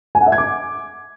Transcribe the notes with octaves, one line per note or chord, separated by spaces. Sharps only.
G#5
F#5
E5
G#6
D6